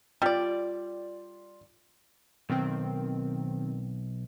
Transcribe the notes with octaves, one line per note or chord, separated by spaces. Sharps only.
G3 F4 D5
B1 D#3 C4